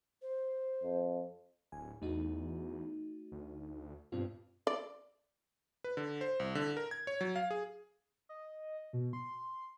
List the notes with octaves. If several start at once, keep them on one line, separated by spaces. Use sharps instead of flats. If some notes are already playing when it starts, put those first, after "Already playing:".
C5
F2
D1 G#5
E2 A3 D#4 F#4
D2
G2 B2 C4 F4
D5
B4
D3
C5
C2
D3
A#4
G#6
C#5
F#3
F5
G#4
D#5
B2
C6